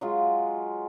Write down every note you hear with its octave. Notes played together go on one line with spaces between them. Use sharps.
F#3 G#3 F4